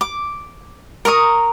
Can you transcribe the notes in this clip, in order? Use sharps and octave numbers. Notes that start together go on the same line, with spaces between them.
D6
A#4 A#5 C#6 D#6